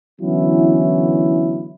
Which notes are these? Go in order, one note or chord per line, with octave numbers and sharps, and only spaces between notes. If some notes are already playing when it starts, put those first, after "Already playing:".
D3 E3 F#3 B3 C#4 E4